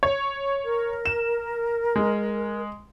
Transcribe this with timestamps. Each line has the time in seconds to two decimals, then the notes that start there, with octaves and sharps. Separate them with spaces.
0.03 C#5
0.64 A#4
1.06 E7
1.96 G#3